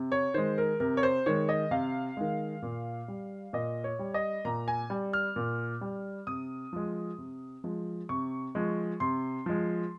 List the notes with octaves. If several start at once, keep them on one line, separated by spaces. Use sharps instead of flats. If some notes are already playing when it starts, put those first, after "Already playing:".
Already playing: C3
C#5
D#3 G#3 C5
A#4
C3 A#4
C#5
C5
D#3 G#3 C#5
D#5
C3 F5
D#3 G#3
A#2
G3
A#2 D#5
C#5
G3
D#5
A#2 A#5
G#5
G3
F6
A#2
G3
C3 D#6
F3 G#3
C3
F3 G#3
C3 C#6
F3 G#3
C3 C6
F3 G#3